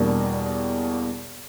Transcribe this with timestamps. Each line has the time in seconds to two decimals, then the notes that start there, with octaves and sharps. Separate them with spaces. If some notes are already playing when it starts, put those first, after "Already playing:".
Already playing: E2 B2 G3 A#3 D4